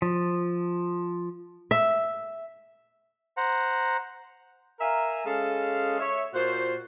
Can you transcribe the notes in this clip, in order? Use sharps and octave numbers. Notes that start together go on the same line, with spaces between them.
F3
E5
C5 F#5 A#5
A#4 E5 F5 G#5 A#5
G#3 C#4 G#4 A4 F5
C#5 E5
A#2 F4 F#4 C5